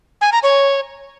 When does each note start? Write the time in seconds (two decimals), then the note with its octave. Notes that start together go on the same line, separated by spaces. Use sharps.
0.21 G#5
0.32 A#5
0.43 C#5